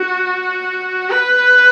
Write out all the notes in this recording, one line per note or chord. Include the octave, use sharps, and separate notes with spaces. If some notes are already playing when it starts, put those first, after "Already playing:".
Already playing: F#4
B4